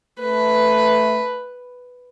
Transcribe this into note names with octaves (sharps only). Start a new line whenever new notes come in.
A3 B4